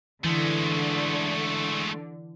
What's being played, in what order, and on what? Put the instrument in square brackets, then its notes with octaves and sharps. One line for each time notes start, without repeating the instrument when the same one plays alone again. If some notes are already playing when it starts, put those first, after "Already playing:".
[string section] D3 [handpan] E3 [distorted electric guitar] G#3 A3